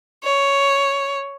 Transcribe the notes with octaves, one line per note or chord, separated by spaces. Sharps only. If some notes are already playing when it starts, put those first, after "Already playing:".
C#5